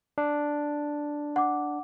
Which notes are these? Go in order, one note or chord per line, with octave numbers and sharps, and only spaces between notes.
D4
F#5 D6